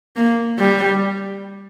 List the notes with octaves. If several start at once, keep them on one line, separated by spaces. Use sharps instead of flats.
A#3
G3